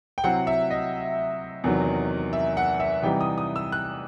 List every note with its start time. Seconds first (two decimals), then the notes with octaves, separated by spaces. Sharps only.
0.18 G5
0.24 C3 F#3 C4 E4 F#5
0.47 E5
0.70 D#5
1.64 E2 C3 D#3 F#3
2.33 E5
2.57 F#5
2.80 E5
3.03 C3 E3 G3 D#4 G5
3.21 D#6
3.38 D#6
3.56 E6
3.72 F#6